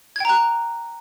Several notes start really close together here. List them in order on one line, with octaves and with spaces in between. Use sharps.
G#6 G5 A#5 F#6